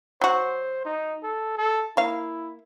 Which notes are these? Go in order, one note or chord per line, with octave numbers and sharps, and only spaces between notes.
F#3 F#4 C5
D#4
A4
A4
A#3 E4 F5